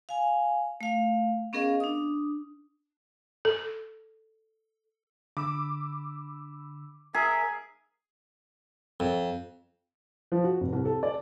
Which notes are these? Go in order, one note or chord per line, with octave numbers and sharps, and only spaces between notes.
F5 G#5
A3 F5
B3 C#4 G#4 A#4 D#5 F5
D4 D#6
A4
D3 B5 D6 E6
G#4 A#4 E5
F2
F3
F#4
F1
C2
A4
D5